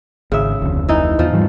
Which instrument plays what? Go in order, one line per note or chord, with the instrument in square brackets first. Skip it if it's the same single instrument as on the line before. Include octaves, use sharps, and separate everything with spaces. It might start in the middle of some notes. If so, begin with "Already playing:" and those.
[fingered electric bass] G#1 [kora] C#3 E5
[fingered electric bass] F1 D2
[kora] E3 D#4
[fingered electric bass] E2 [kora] F3
[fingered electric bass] G#2 E3 G3